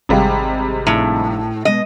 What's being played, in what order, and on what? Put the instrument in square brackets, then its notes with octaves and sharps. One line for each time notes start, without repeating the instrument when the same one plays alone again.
[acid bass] G#1 [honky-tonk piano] C3 G3 G#3 [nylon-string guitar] D#5 F5 G5
[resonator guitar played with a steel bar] A2 [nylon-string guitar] F3 D4 D#4
[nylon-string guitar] B2 G#3 B3 [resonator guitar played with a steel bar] D#5